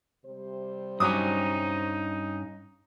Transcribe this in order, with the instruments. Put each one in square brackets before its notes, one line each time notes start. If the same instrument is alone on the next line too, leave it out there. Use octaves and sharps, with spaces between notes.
[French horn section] C3 G3 C5
[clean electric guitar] G2 C#4 [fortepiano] F#3 D6 D#6 [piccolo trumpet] D#4